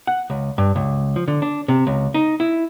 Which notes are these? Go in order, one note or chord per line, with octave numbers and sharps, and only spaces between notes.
F#5
C#2
G2
C#2
F3
D3
D4
C3
C#2
D#4
E4